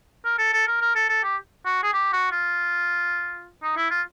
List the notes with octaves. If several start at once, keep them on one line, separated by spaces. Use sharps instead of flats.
A#4
A4
A4
A#4
A#4
A4
A4
G4
F#4
G#4
G4
F#4
F4
D#4
E4
F4